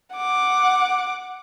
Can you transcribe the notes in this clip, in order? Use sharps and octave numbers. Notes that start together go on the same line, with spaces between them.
F#5 D6